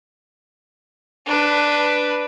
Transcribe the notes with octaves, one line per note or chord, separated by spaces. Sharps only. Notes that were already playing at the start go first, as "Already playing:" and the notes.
D4 B4